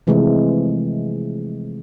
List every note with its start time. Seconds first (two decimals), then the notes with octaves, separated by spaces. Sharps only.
0.07 C3 E3 F3 G#3 A3 C4